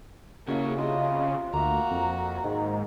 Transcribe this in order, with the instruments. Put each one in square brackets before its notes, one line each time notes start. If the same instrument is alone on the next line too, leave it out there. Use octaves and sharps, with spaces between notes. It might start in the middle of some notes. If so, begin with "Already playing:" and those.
[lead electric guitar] D#2 C#5 [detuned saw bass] C#3 [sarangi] A#3 [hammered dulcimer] E4 F#4
[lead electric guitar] C3 [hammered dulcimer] F4 [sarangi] D#5
[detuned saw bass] D2 [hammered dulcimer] A#3 E5 [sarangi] F#4 [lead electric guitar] A#5
[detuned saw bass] F2
[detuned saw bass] G#2 [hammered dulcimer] D#3